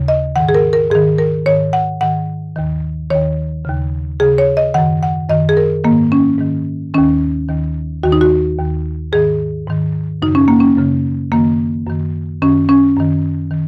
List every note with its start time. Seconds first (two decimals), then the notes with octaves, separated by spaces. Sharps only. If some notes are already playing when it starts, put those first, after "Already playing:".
Already playing: D#2 C#3
0.08 D#5
0.36 G#2 D#3 F#5
0.49 G#4
0.55 A#4
0.73 A#4
0.91 G#2 D#3 G#4
1.18 A#4
1.46 G#2 D#3 C#5
1.73 F#5
2.01 G#2 D#3 F#5
2.56 D#2 D#3
3.10 D#2 D#3 C#5
3.65 D#2 C#3
4.20 D#2 C#3 G#4
4.38 C#5
4.57 D#5
4.74 F#2 D#3 F#5
5.03 F#5
5.29 F#2 D#3 D#5
5.49 G#4
5.57 A#4
5.84 G#2 D#3 A#3
6.12 C#4
6.38 G#2 D#3
6.94 D#2 D#3 C#4
7.48 D#2 D#3
8.03 D#2 D#3 F#4
8.12 D#4
8.21 F#4
8.58 D#2 D#3
9.12 G#2 D#3 G#4
9.67 G#2 D#3
10.22 F#2 C#3 D#4
10.35 C#4
10.48 A#3
10.60 C#4
10.77 F#2 C#3
11.32 F#2 D#3 A#3
11.87 F#2 D#3
12.42 F#2 D#3 C#4
12.69 C#4
12.97 F#2 D#3
13.51 D#3